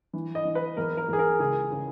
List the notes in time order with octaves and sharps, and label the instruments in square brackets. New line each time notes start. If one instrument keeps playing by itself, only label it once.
[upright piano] E3
D#5
E3
B4
E2 A#4
A#4
E2 G#4
A#4
C#2 G#4
C#3